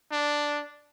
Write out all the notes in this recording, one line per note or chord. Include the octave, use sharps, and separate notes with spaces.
D4